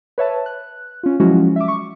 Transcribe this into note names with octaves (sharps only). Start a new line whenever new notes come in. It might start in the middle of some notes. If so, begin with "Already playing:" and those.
B4 C#5 E5 A5
F#6
C#4 F4
F3 F#3 G#3 C#4 E4 F#4
E5 D6
C#6